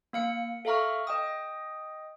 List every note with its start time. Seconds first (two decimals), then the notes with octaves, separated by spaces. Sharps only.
0.13 A#3 F5 C#7
0.65 A4 E5 F5 A#5 C#6 F6
1.07 D#5 G5 D#6